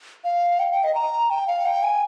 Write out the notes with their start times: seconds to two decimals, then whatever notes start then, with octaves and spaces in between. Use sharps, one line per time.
0.24 F5
0.60 G5
0.72 G5
0.83 D#5
0.95 A#5
1.30 G5
1.47 F5
1.65 G5
1.83 G#5